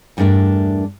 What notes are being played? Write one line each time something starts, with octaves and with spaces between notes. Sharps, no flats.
E2 G2 A3 D4 A#4 E5